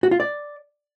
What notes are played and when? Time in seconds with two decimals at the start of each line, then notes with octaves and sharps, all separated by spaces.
0.03 F#4
0.11 F4
0.20 D5